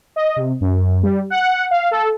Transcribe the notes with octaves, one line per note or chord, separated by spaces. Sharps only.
D#5
C3
F#2
G3
F#5
F5
A4